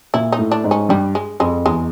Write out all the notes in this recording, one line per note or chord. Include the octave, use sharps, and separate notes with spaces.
A#2 E4
D#4
A2
D4
G#2
C#4
G2 G3
G#3
F2 G#3
E2 G#3